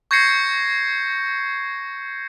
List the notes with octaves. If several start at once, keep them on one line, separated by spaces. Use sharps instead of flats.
C#6 G6 G#6 A#6 C7 C#7